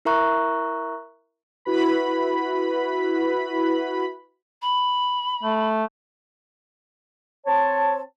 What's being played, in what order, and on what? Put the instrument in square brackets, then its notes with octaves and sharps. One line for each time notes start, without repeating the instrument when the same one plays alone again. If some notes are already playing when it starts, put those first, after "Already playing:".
[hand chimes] E4 A#4 E5 A#5 C#6 F#6
[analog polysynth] E4 F#4 B4 B5
[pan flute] B5
[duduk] A3
[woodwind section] C4 C#5 A5